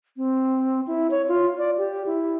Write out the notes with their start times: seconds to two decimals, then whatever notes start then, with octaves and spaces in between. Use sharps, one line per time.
0.17 C4
0.87 E4
1.11 C#5
1.28 F4
1.58 D5
1.78 G4
2.06 E4